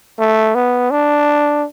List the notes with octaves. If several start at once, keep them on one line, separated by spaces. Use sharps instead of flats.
A3
B3
D4